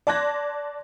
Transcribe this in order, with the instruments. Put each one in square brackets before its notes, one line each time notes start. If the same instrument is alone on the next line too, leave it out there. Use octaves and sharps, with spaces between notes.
[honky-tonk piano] D5 A5 C6 F#6 G#6 A#6